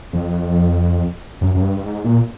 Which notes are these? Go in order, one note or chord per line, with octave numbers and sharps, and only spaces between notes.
F2
F#2
F#2
G2
G2
G#2
A#2